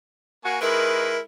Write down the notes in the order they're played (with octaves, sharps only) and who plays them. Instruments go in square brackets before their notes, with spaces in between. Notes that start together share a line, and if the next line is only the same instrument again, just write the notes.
[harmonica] A#3 G#5 [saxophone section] F#4
[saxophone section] D#3 B4 [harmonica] G#3 E4 [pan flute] A#4